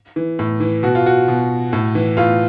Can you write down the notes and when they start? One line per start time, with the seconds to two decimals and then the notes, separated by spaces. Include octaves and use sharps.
0.16 E3
0.39 A2
0.60 E3
0.83 B2 F#4
0.95 F4
1.06 F#4
1.28 B2
1.73 A2
1.95 E3
2.17 A2 F4